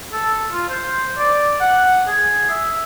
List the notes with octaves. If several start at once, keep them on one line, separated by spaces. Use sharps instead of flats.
A4
F4
C5
D5
F#5
G#4
E5